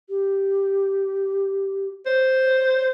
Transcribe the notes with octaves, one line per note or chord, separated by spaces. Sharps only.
G4
C5 C#5